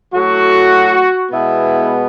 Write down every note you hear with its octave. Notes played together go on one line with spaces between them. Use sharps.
A2 F#3 A3 F#4
B2 G#3 B3 E4